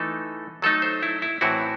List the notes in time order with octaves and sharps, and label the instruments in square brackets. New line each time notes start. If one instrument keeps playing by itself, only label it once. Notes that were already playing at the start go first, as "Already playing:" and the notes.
Already playing: [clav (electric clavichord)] E3 A3 D#4 A4
F#3 A3 D#4 A4
C5
E4
E4
A2 E3 C4 E4 F#4